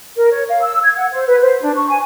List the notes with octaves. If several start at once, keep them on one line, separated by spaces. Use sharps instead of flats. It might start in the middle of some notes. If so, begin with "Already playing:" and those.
A#4
C#5
F5
E6
G#6
F#5
C5
B4
C5
D4
C#6
G#5